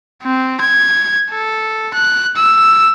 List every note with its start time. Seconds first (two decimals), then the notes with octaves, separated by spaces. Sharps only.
0.23 C4
0.61 G#6
1.30 A4
1.94 F#6
2.36 E6